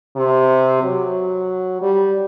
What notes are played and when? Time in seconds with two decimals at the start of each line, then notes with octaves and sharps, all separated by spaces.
0.16 C3
0.82 F#3
1.82 G3